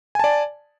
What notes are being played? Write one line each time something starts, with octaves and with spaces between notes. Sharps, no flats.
D5 G#5 A5